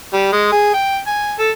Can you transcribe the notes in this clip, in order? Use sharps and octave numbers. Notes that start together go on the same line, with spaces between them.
G3
G#3
G#4
G5
G#5
A4